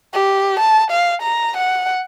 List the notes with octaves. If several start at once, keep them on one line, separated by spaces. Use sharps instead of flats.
G4
A5
F5
A#5
F#5